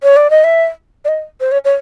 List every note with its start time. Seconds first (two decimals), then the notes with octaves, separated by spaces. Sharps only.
0.03 C#5
0.16 D5
0.30 D#5
0.44 E5
1.05 D5
1.08 D#5
1.40 C5
1.51 C#5
1.65 C#5